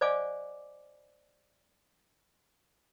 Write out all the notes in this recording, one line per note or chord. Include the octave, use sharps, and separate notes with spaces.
C5 D5 D#5 F5 G#5 D6